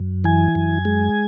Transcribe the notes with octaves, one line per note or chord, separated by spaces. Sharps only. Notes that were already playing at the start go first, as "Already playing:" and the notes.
Already playing: F#2
E3 G#5
F#2
G#3